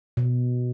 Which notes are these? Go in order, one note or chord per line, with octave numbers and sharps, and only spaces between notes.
B2